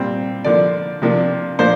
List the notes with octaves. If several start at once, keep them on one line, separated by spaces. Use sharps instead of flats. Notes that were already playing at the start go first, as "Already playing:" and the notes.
Already playing: A#2 G3 C4
D3 F3 A#3 D4 D5
C3 F3 A#3 D4
A#2 F3 A#3 D4 C5